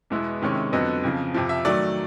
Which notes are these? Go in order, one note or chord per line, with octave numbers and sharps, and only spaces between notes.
E2 B2 G#3 B3 E4
C3 D#3 G#3 C#4 E4
F2 D3 F#3 B3 D#5
F2 C#3 F3
F2 C3 F3
E5
D#3 F#3 A3 D5